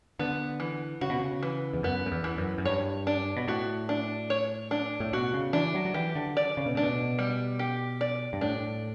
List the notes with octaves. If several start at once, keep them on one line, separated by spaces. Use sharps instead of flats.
D3 B3
E3
C#3 F#4
B2
C#3
E3
E2
F#2 B3
F#2
E2
E3
F#2
F#2
G2 C#5
D4
B2
A2 F#4
D4
C#5
D4
A2
B2 F#4
C#3
E3 D4
F#3
F#3
E3 G4
D3
D5
C#3
B2
A2 D4
B2
G3
G4
D5
G2
A2 D4